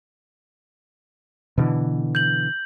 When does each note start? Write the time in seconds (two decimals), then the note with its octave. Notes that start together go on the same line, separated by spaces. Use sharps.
1.58 B2 D3 E3
2.15 G6 F#7